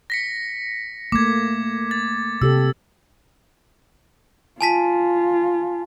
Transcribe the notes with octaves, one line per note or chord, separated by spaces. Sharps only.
A#6 B6 C#7
A3 A#3 D6 G#6
A6
C3 G4 A4 E6
F4 G#5 A5 B6